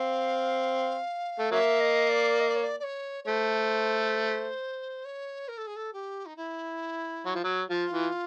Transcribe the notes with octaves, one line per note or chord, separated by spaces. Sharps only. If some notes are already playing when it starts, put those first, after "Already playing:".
Already playing: C4 F5
A3
F#3 A#3 E5
D#5
D5
D#5
D5
C#5
D5
D5
C#5
C#5
A3 C5
C#5
A#4
A4
G#4
A4
G4
D#4
E4
F#3
F3
F#3
F3 F4
E3